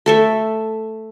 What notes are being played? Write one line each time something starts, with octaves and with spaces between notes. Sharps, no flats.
A3 A4 E5